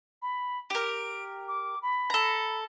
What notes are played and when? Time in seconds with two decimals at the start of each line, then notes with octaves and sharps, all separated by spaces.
0.22 B5
0.70 G4 A#4 D7
1.48 D6
1.82 B5
2.10 A4 A#5